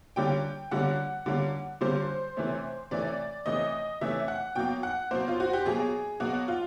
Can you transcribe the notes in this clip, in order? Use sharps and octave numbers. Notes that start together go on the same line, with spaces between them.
D3 G3 A#3 C#4 G5
D3 G3 A#3 C#4 F#5
D3 G3 A#3 C#4
D3 G3 A#3 C#4 C5
C3 E3 A3 C#4
C3 E3 A3 C#4 D5
C3 E3 A3 C#4 D#5
C3 E3 A3 C#4 E5
F#5
B2 F#3 A#3 G5
F#5
B2 F#3 A#3 C5
F4
F#4
G4
B2 F#3 A#3 G#4
B2 F#3 A#3 F#4
F4